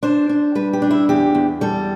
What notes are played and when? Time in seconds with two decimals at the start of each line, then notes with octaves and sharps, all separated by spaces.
0.03 D4 C5
0.29 D4
0.55 G3 B4
0.73 G4
0.82 D4
0.91 E4
1.09 E2 G4
1.35 E2
1.61 G3 A4